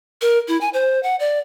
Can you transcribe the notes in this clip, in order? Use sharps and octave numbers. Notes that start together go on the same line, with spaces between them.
A#4
E4
G#5
C5
F#5
D5